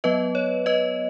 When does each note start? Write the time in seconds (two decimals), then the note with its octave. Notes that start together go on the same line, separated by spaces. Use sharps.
0.04 F#3 B3 B4 D#5
0.35 C#5
0.66 B4 D#5